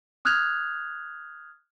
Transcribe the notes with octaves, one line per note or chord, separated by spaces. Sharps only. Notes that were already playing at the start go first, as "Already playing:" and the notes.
D#6 F6 F#6 G#6 F7